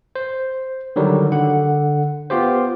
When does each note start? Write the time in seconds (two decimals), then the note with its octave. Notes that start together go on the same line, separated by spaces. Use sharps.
0.15 C5
0.96 D3 D#3 F#3 G3
1.32 D3 F#5
2.30 B3 F4 G4 C5